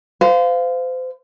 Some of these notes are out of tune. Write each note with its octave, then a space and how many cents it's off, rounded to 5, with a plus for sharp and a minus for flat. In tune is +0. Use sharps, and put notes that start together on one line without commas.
C5 -35 F5 +0